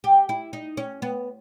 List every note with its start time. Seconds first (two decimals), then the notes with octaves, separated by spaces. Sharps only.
0.04 G4
0.29 E4
0.53 D#4
0.77 C#4
1.02 B3